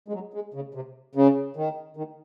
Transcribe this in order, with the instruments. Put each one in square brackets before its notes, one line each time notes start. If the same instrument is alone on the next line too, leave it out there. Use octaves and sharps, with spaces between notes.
[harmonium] G#3
F#3
G#3
C#3
C3
C#3
D#3
D#3